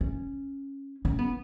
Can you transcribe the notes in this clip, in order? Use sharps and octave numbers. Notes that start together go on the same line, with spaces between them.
C#4
C#4
B3